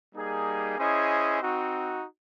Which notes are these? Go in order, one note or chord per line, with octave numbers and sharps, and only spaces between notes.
G3 A#3 D#4 G#4
C#4 E4 G#4 C5 D#5
C4 D#4 F#4